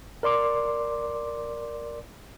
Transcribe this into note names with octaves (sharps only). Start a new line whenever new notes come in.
A#4 D5 C6 D6